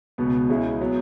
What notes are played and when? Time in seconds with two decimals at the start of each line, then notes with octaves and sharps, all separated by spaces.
0.18 C#2 B2 B3
0.49 C#2 C#3 G#3 E4
0.81 F#3 B3